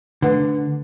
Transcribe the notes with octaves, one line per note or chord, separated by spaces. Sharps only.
D3 A3 B4 F#5